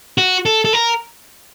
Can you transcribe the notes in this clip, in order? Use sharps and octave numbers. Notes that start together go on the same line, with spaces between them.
F#4
A4
A4
A#4